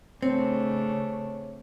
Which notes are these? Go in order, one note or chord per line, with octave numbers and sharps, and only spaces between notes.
C#3 A3 C4 D4 C#5